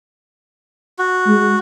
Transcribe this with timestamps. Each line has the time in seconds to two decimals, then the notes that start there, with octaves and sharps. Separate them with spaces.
0.99 F#4
1.27 G#3